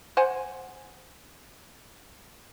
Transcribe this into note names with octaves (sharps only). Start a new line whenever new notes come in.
C5 F#5 G#5